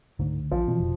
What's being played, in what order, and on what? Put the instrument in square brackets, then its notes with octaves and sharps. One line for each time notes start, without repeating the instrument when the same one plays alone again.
[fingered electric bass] C#2 D3 A3 [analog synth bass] G#2
[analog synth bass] A#1 [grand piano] F3
[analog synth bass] B2 [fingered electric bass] E3 C4
[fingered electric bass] F1